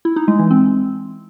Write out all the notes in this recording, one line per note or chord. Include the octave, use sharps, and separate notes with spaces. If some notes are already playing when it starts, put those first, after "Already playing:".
E4
D#4
G#3
E3
C4